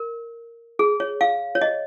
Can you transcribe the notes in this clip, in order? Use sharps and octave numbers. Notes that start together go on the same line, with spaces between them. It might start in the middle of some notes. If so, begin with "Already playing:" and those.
Already playing: A#4
G#4
C#5
F5
C#5
D#5